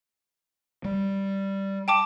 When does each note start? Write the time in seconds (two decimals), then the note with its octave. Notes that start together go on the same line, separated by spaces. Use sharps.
0.85 G3
1.88 G5 A5 D6